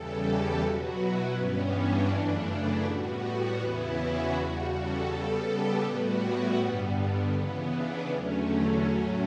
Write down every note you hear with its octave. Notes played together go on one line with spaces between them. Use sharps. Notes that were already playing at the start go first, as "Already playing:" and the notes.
Already playing: E2 C#3 E3 G3 A4
G4
B2 F#3 B3 F#4
E4
G2 E3 G3 B3 C#4
D4
F#2 C#3 E3 A3
E4
A2 G3 B3 F#4
F#4
E2 C#3 E3 B3 E4
F#4
E2 C#3 G3 F#4
A4
C#3 G3 B3 A4
G4
A2 G3 B3 F#4
E4
G2 D3 G3 B3
C#3 E3 B3
D4
E2 D3 F#3 A3 C#4
C#4
A2 F#3 A3 C#4